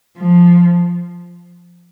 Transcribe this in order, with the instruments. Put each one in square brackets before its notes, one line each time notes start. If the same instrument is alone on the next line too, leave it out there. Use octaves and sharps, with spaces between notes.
[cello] F3